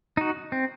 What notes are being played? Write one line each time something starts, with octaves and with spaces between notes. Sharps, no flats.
D#4 F#4
C4